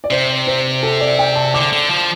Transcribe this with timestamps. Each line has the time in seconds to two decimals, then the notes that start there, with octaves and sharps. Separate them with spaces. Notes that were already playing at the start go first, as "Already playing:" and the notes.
0.04 D5
0.11 C3 C5
0.47 C5
0.83 A4
1.00 D5
1.19 G5
1.36 A5
1.54 D3 D6
1.73 D3
1.90 F3